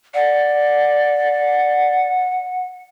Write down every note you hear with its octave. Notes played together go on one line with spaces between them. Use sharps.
D5 F#5